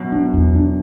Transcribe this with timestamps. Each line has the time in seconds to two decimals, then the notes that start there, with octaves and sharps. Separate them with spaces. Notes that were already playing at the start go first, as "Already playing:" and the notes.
Already playing: F#2 B2
0.12 D4
0.34 E2
0.55 D4